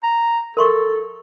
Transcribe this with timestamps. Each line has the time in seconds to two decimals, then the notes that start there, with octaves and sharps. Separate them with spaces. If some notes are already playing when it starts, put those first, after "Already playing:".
0.04 A#5
0.57 A4 A#4 C6 C#6